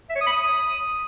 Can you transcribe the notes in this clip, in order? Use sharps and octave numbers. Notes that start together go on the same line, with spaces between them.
E5
C#5
D#6
B5
D#6